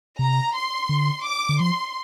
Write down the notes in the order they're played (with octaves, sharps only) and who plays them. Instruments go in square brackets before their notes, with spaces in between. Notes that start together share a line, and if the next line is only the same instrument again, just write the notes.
[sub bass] C3 [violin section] A#5
[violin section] C6
[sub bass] D3
[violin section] D6
[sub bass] D3
[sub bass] F3 [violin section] C6